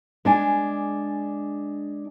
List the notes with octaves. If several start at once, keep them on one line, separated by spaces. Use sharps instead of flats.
G#3 D4 G#5